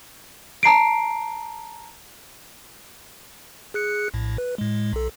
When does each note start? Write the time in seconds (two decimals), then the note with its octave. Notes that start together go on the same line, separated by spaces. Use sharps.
0.63 A5 A#5 C7 D7
3.74 G#4 F#6 C#7
4.14 A#1 A2
4.38 B4
4.58 A2 G#3
4.93 B1 A4